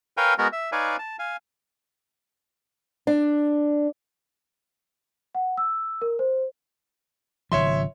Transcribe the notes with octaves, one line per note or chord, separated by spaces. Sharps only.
A#4 B4 C#5 F5 G5 G#5
G#3 B3 F#4 A#4
E5
D#4 B4 C#5 D5 F5 G#5
A5
F5 G#5
D4
F#5
E6
A#4
C5
G#1 C#3 F3 C#5 E5 C6